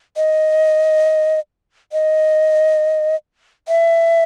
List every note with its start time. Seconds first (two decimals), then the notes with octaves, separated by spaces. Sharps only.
0.17 D#5
1.93 D#5
3.68 E5